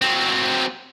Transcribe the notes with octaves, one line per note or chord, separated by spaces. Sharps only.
F#3 C4